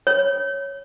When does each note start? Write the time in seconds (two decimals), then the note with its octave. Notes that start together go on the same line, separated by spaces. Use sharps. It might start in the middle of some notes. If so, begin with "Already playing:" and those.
0.07 C#5